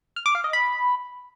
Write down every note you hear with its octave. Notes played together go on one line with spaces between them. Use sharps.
F6
D6
F5
D#5
B5